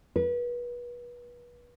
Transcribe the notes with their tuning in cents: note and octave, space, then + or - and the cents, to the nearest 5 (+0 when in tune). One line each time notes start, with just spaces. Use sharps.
B4 -30